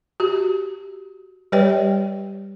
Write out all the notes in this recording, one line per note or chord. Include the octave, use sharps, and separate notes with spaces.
F#4 G4
G3 G4 B4 C#5 D5 G5